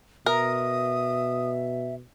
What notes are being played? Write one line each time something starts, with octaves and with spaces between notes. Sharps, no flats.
B2 A#4 E5 D#6